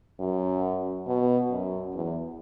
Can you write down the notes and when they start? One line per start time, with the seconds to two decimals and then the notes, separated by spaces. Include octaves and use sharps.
0.20 F#2
1.07 B2
1.50 F#2
1.94 E2